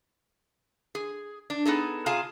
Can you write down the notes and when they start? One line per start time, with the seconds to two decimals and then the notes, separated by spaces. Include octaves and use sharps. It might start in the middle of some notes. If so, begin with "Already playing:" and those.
0.95 G#4
1.50 D4
1.65 B3 D#4 G#4 A4
2.06 C3 F4 G#4 F5 G#5 A5